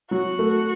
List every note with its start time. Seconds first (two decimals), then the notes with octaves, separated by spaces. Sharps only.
0.11 F#3 F#4
0.39 A3